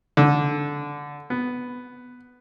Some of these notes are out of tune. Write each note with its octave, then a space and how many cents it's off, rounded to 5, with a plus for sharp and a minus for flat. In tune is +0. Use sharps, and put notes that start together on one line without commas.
D3 -10
B3 +5